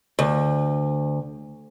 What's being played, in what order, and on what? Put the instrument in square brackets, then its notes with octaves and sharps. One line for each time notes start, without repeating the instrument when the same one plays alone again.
[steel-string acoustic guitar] D2